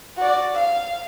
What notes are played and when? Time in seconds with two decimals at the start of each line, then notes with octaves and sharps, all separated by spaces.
0.17 F#4 D5
0.53 F5